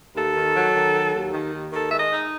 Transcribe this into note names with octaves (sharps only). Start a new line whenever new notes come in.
D#2 A4
D#3
F#3
D#3
F#3
D#2
D#3
D#2
D#3 A4
G#3 E5
D#5
D#4